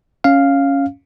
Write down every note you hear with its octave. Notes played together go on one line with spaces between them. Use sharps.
C#4 F5